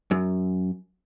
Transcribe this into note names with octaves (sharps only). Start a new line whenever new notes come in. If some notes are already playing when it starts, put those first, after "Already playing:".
F#2